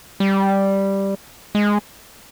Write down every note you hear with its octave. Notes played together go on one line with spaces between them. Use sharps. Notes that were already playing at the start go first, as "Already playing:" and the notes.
G3
G#3